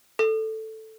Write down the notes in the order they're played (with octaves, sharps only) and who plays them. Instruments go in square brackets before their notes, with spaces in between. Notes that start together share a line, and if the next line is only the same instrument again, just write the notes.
[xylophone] A4